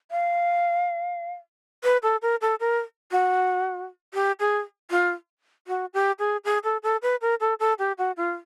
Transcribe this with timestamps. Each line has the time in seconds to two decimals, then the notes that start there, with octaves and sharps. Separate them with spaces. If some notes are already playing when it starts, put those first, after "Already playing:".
0.11 F5
1.84 B4
2.03 A4
2.22 A#4
2.41 A4
2.60 A#4
3.11 F#4
4.14 G4
4.40 G#4
4.91 F4
5.68 F#4
5.94 G4
6.19 G#4
6.45 G#4
6.64 A4
6.83 A4
7.02 B4
7.21 A#4
7.40 A4
7.60 A4
7.79 G4
7.98 F#4
8.17 F4